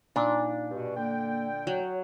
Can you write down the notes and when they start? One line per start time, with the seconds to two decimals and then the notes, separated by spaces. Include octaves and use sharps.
0.16 A#2 D4 D#4
0.71 G2 B2
0.96 D3 A#3 G5
1.67 F#3 C#5